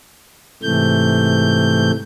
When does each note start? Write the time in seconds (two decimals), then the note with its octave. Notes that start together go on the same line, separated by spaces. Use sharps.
0.63 G#2 C3 E3 A3 G6